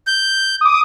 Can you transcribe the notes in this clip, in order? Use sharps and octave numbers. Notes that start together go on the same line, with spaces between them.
G6
D6 D#6